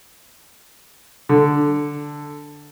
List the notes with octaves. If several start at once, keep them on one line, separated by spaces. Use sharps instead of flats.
D3